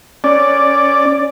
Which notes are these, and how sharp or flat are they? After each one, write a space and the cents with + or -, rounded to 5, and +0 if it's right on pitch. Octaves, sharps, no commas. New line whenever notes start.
C#4 +0 D5 +0